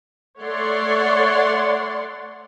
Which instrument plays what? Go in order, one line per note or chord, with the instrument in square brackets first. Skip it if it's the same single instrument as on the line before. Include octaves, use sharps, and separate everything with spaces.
[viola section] A3 C#5 D5 F#5 C6